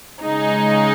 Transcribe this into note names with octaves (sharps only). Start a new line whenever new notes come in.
C#3 G#3 D#4 G#4